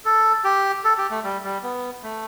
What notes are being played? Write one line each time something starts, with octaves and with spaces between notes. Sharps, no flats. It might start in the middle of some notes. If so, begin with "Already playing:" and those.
A4
G4
A4
G4
A3
G3
G3
B3
A3